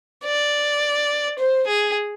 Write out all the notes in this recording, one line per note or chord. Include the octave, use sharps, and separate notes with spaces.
D5
C5
G#4